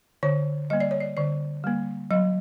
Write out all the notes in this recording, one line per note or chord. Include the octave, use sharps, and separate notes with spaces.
D3 C#5
G3 A#3 D#5
D5
C#5
D5
D3 D5
G3 A#3
F#3 D#5